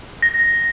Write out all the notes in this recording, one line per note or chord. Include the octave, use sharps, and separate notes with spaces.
A#6